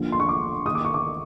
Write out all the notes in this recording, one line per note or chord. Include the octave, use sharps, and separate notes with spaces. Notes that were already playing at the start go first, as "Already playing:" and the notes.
Already playing: D#2 D3 F3
C6
C#6
D6
D#2 D#3 D#6
D6
C#6
D6